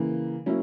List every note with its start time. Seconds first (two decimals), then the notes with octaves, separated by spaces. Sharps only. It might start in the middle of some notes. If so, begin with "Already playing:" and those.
Already playing: C#3 E3 A#3
0.46 F#3 A#3 C#4 E4